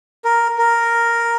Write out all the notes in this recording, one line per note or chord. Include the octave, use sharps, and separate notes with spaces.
A#4
A#4